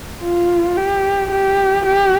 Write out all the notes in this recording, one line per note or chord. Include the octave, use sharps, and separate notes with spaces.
F4
G4
G4
G4